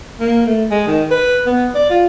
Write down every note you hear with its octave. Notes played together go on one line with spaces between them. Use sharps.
A#3
A3
G#3
D#3
B4
B3
D5
F4